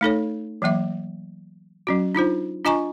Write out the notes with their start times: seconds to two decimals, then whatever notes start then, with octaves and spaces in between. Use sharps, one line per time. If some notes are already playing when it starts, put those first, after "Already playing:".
0.01 A3 D#4 A4 C#5
0.62 E3 F#3 A#3 E5
1.87 F#3 C#4 F#4
2.15 D4 D#4 F4 C5
2.65 D4 F4 D#5 G#5 A#5 C#6